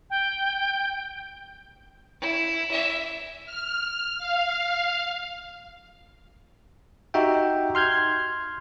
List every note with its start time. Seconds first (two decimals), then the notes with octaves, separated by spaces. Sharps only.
0.10 G5
2.21 E4
2.71 E5
3.46 F6
4.18 F5
7.14 D#4 F#4 G4 E5 G5
7.75 C6 F6 G6 G#6